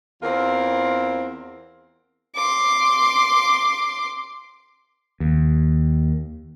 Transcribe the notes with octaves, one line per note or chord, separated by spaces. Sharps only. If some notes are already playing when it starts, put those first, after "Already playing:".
E2 C4 F4 A#4
C6 D6
D#2